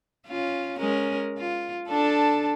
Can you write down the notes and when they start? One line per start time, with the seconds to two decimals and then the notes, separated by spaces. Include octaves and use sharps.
0.27 C#4 F4
0.79 G#3 C#4 A#4
1.38 F4
1.88 D4 A4